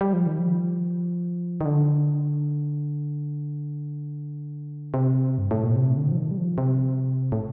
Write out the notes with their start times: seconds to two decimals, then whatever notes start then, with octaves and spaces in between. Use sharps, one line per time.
0.01 G3
0.13 F3
0.26 D#3
0.39 F3
1.61 D#3
1.65 D3
4.94 C3
5.38 G2
5.51 A2
5.64 A#2
5.76 C3
5.97 D3
6.12 F3
6.17 D#3
6.31 G3
6.38 F3
6.58 C3
7.32 A2